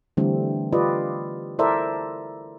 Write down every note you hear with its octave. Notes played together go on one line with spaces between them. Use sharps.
D3 E3 G3 A3 C4
F4 G4 B4 D5 D#5
E4 A4 A#4 C5 D5 E5